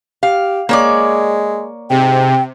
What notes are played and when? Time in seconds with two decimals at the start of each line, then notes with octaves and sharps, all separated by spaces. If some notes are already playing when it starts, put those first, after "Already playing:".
0.23 G4 F5
0.69 G#3 A#3 C#5 D5
1.90 G#2 C3 G5